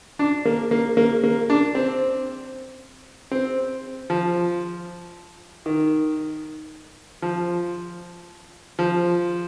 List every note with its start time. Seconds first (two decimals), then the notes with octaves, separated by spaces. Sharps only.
0.19 D4
0.45 A#3
0.71 A#3
0.97 A#3
1.24 A#3
1.50 D4
1.75 C4
3.31 C4
4.10 F3
5.66 D#3
7.22 F3
8.79 F3